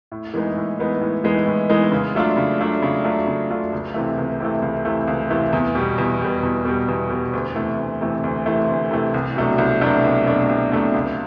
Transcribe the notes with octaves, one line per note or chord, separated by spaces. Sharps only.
A2
E3 G#3 B3 D#4
A2
E3 G#3 B3 D#4
A2
E3 G#3 B3 D#4
A2
E3 G#3 B3 D#4
C#3
F#3 A3 D4 F4
C#3
F#3 A3 D4 F4
C#3
F#3 A3 D4 F4
C#3
F#3 A3 D4 F4
C#2
C3 E3 A3
C#2
C3 E3 A3
C#2
C3 E3 A3
C#2
C3 E3 A3
E2
B2 G3
E2
B2 G3
E2
B2 G3
E2
B2 G3
D2
C3 E3 A3
D2
C3 E3 A3
D2
C3 E3 A3
D2
C3 E3 A3
C2
B2 F#3 A3 D4
C2
B2 F#3 A3 D4
C2
B2 F#3 A3 D4
C2
B2 F#3 A3 D4
C#2